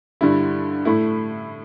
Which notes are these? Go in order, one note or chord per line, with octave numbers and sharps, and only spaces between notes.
G2 D3 G3 E4
A2 A3 E4